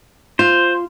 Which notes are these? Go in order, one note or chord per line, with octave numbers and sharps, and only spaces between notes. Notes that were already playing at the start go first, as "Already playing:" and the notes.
F4 C5